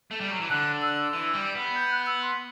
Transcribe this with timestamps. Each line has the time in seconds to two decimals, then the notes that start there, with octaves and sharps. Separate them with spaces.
0.11 A3
0.21 G3
0.31 F#3
0.40 E3
0.50 D3 F#6
0.82 E6
1.13 E3
1.33 G3
1.55 B3
1.75 G6
1.91 F#6
2.06 E6
2.22 C6